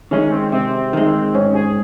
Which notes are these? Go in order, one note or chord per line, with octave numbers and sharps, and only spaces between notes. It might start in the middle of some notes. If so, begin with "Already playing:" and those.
D#3 G#3 C#4
C4
C3 C4
D#3 G#3
G#2 C#4
G#4